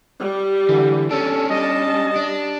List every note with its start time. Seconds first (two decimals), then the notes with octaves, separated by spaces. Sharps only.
0.22 G3
0.69 D3 E3
1.11 C#4 D4 A4
1.50 G3 D#5 A5
2.16 D4